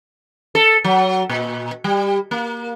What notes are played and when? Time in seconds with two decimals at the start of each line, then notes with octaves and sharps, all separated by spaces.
0.55 A4
0.84 F#3
1.29 A#2
1.84 G3
2.31 A#3